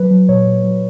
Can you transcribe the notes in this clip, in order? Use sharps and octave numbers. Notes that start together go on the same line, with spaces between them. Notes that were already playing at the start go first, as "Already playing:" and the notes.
Already playing: F#3 B4
F#3
A#2 C#5
A#2
F#3